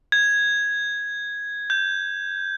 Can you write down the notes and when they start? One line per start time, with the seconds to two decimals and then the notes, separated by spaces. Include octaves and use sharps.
0.12 G#6
1.70 G6